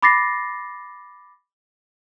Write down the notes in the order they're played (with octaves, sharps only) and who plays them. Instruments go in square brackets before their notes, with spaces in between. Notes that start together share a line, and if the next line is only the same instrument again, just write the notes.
[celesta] B5 D6 A6 A#6 C7